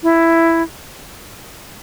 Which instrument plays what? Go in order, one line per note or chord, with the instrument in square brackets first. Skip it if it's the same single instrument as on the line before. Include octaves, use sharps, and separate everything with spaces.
[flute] E4